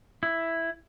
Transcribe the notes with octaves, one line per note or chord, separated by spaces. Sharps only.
E4